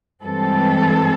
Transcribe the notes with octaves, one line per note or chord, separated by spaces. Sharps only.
G2 E3 G#3 C4 A4